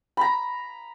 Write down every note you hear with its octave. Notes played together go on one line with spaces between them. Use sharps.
A#5 B5